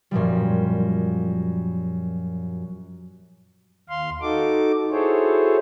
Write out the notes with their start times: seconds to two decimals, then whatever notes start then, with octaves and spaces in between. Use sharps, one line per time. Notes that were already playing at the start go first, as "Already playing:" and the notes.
0.11 F#2 A#2 F3 G3
3.89 D#2 F5 C6
4.21 D#4 F#4 A4 D6
4.91 E4 F#4 G#4 A4 C5 C#5